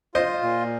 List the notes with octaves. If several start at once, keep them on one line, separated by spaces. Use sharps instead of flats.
F4 C5 D#5
A#2